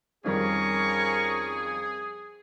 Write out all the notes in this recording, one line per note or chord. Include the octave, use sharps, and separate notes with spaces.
F2 D#3 G3 C#4 G#4 A#4 C#6